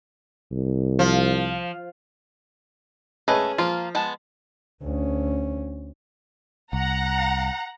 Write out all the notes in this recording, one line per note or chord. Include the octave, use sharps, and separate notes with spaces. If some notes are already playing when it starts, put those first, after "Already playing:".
C2
F3
A3 C#4 G#4 B4 D#5
F3 A#3 F4
G#3 B3 A5
D2 C#4
C2 F#5 A#5